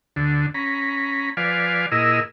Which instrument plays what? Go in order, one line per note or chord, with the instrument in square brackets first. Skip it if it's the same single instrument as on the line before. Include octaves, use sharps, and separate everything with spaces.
[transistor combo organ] D2 D3
C#4 A#5 B5
F3 B4 D5 F5 G#5
A#2 E4 G#4 A#4 D#5 E6